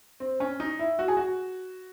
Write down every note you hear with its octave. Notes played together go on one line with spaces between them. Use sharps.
C4
C#4
D#4
E4
F#4
G#4
F#4